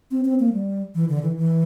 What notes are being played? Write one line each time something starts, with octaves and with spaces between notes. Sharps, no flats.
C4
C4
A#3
G3
E3
D3
E3
E3